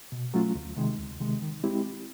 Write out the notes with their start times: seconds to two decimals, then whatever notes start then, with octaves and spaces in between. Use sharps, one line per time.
0.12 B2
0.34 F#3 A3 C#4 F4
0.55 D2
0.76 C3 D#3 G#3
0.99 D2
1.21 C3 D#3 G#3
1.42 D#3
1.64 G#3 C4 E4 G4